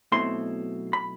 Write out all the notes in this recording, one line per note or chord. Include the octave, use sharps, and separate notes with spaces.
B1 B2 A3 C4 E4 C6
B5